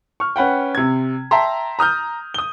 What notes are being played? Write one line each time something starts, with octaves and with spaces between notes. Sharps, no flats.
C#6 F6
C#4 B4 F#5 G5
C3 G#6
E5 G5 A5 A#5 C6
A#5 D#6 F6 G6
D#6 G7